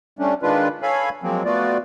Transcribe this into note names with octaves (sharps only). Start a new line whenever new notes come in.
G3 A3 C#4 D4
D#3 G#3 D4 F4 B4
A4 C#5 F5 G#5 B5
F3 F#3 G#3 A#3 C4
A3 B3 F4 F#4 D5